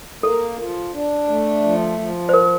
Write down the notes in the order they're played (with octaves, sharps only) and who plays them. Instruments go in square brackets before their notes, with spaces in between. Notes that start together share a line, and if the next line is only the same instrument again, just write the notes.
[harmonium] A#3 [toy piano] A4
[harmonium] F3
D4
A3
F3
F3
[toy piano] C5
A#4